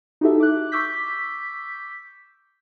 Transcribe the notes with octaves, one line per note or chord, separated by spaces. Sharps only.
D#4 E4 F#4 G4 A4 E5
D6 F#6
C#6 D6 E6 G6 B6